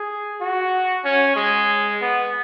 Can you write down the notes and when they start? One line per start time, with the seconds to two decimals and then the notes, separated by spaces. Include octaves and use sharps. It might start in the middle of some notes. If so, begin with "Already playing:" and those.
Already playing: G#4
0.41 F#4
1.05 C#4
1.36 G#3
2.01 B3